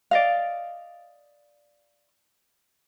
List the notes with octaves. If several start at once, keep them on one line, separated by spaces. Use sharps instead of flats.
D5 D#5 F5